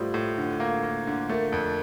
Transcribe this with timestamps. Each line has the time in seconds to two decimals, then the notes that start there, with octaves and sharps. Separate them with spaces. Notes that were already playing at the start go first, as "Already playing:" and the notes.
Already playing: A2 G3 F4 C5 D#5
0.14 A2
0.38 D3
0.60 A#3
0.83 A#3
1.07 D3
1.29 A3 A#4 D5
1.52 F2